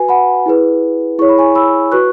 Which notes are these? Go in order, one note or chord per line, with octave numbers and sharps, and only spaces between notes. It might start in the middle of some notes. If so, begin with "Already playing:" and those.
Already playing: F#4 B4 G#5
F#5 B5
E4 G#4 B4
E4 G#4 C#5 C#6
B5
G#5 C#6
B5 E6
F#4 B4 C#6 F#6